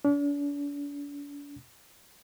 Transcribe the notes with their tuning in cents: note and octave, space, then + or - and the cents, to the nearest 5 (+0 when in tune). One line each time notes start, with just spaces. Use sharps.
D4 -40